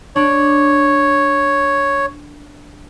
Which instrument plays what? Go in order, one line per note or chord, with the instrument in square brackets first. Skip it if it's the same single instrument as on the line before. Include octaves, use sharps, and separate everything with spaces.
[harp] D4 [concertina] C#5